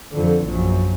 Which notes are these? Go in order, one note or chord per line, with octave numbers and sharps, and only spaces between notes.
F2 D3
A#1 F#2